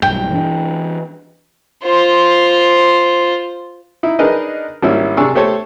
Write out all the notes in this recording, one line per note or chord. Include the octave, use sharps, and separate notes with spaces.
B1 G2 G5
E3 D4
F4 C5
D#4 E4
D4 D#4 G#4 A#4 B4 D#5
G#1 G3 A#3 C#4 E4 E6
C3 D4 G#4 G#5 C#6 E6
A3 G4 A4 C5 C#5